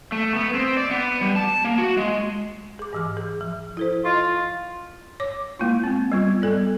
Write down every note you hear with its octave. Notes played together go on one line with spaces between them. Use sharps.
A3
B3
C4
D5
B3
G3
A5
A#3
F#4
G#3
G#4 D6
G#2 E3 F6
G#4
F3
E4 A4 C5
F4 D#5 C#6
C#5 D6
G#3 A#3 E4 F4
B3 C4
G3 B3 F4
G3 B3 A4 D5